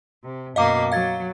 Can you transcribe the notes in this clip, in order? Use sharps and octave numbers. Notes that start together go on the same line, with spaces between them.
C3
F#2 B2 A#3 D#5 F5 D6
F#3 F5 G#6 A6